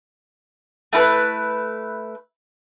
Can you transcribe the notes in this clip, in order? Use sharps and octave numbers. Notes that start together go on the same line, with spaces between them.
A3 E4 A4 B4